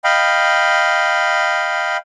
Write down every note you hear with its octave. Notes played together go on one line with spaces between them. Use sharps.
D#5 F5 G5 B5